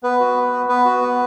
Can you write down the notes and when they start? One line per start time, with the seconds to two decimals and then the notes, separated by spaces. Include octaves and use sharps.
0.03 B3 B4
0.20 F#4
0.36 B3
0.53 B3
0.69 B3 B4
0.85 F#4
1.02 B3